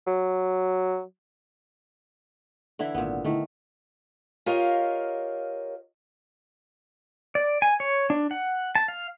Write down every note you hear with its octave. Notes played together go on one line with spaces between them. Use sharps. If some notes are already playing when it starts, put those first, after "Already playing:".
F#3
D3 E3 E4
G#1 A#2 B3
D3 D#3 A3 E4
F4 G4 A#4 C#5 D#5 F5
D5
G#5
C#5
D4
F#5
A5
F5